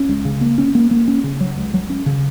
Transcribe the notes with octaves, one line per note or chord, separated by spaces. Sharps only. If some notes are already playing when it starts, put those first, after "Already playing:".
Already playing: C#4
C#2
C#3
A#3
C#4
A#3
A#3
C#4
C#3
F#3
C#2
F#3
C#4
C#3